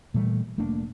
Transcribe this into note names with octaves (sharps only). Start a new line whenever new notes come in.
A#2 E3 G3 A3
F1 A3 A#3 D4